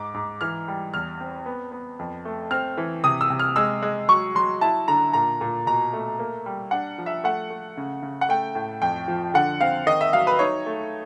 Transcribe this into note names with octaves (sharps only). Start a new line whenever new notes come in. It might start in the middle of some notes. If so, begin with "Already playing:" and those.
Already playing: G#2 D6
G#2
E3 F6
G3
E2 F6
C4
B3
B3
F2
A3
C4 F6
E3
C3 D#6
E6
C3
F6
G#3 E6
G#3
F#3 C#6
F#3 C6
E4 A5
D3 A#5
A#2 A#5
A#2
B2 A#5
A3
A#3
G3
D4 F#5
F3
E5
A3 F#5
A3
C#3
C#3
F#5
A3 G5
A2
F2 G5
F3
D3 F#5
C4 F5
D#3 D#5
E5
F#3 F5
B4
D#4 C#5
A3